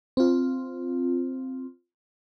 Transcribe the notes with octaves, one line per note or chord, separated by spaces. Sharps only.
C4 F4